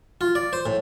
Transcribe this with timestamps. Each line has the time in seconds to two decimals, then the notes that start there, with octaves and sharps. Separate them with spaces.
0.21 F4
0.35 D5
0.53 C5
0.66 A2